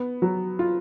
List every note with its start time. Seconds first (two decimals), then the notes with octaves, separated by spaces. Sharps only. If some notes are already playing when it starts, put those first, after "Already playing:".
Already playing: B3
0.22 F#3
0.59 F4